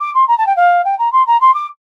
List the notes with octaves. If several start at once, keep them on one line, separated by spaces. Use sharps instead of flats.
D6
C6
A#5
A5
G5
F5
G5
A#5
C6
A#5
C6
D6